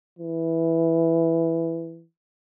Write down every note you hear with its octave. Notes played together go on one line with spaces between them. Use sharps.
E3